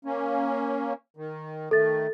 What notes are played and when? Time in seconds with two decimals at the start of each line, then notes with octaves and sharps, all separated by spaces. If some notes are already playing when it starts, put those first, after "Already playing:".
0.05 A#3 C#4
1.17 D#3
1.71 D#3 A3 A4 A6